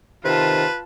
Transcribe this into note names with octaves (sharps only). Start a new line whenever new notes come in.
C3 D#3 F4 B4 A5